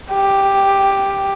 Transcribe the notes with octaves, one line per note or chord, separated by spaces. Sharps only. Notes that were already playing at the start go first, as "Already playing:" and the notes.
G4